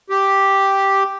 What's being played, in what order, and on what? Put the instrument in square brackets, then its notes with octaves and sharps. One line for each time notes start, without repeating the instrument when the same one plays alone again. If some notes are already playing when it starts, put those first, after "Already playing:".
[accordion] G4